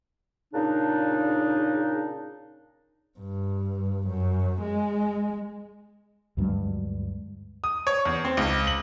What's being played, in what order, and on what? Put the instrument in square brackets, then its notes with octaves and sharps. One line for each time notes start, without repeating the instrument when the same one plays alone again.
[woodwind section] A#2 C#3 D4 D#4
[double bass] G2
F#2
G#3
[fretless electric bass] D2 G2 F#3 G#3
[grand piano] D#6
C#5
E2
C4
C#2
F#7